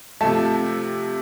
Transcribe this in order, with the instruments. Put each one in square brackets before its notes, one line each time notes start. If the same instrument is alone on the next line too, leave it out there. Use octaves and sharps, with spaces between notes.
[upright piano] C3 F3 A3 A5